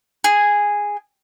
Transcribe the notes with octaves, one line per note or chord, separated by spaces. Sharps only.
G#4